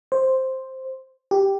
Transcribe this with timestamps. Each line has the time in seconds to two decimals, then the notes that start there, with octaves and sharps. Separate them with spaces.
0.12 C5
1.31 G4